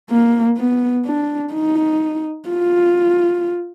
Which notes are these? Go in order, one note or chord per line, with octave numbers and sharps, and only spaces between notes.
A#3
B3
D4
D#4
F4